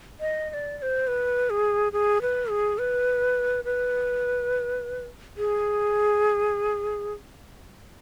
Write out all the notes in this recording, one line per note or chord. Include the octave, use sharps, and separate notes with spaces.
D#5
D#5
D5
D5
C5
B4
G#4
G#4
B4
G#4
B4
B4
G#4